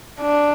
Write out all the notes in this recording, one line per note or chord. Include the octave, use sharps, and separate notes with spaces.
D4